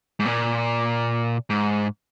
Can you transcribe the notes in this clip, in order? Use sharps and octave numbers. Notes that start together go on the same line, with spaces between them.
G#2
A#2
G#2